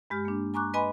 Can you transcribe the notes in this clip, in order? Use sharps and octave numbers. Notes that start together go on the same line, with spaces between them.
G2 G#3 G4 F6
A#3 D4
G#5 A#5 C#6 D6 F#6
B4 D#5 G#5 B5 C6